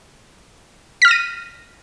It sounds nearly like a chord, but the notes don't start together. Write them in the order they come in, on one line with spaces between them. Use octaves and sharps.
B6 F6 A#6 D#7